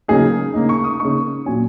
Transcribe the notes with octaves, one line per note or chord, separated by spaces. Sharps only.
C#3 F#3 A#3 D#4 G#4
C#3 A#3 D#4
C#6
D#6
C#3 A#3 D#4 C#6
A#2 F#3 C#4 G#5